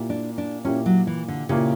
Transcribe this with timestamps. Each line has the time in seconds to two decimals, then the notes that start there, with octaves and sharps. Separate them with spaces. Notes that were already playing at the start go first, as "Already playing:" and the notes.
Already playing: A#2 A#3 E4 G4
0.10 D4
0.38 D4
0.65 A#2 A#3 C#4 E4 G4
0.86 F#3
1.07 E3
1.28 D3
1.49 A#2 C#3 A#3 E4 G4